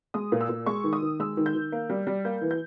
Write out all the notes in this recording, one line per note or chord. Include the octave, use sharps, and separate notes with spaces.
G#3 D#6
A#2
E6
A#2
G#3 C#6
D#3
D#6
D#3
G#3 E6
D#3
G6
D#3
A#3
G3
G3
A#3 G6
E3
G6